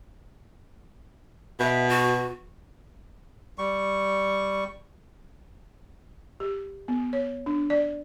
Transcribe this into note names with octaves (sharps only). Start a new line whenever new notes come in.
B2 E5
F#4
G3 C#6
G4
B3
C#5
D4
D5